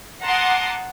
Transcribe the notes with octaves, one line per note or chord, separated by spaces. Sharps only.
F#5 A5 A#5 C6 D6 D#6